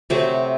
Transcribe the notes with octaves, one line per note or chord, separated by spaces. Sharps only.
C3 F#3 A3 C4